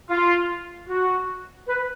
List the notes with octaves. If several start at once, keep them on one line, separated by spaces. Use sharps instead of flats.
F4
F#4
B4